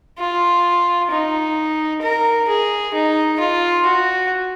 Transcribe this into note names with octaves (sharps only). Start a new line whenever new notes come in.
F4
D#4
A#4
G#4
D#4
F4
F#4